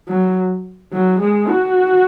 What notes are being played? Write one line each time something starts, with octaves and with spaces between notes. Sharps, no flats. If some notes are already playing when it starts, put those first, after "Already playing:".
F#3
F#3
G#3
F#4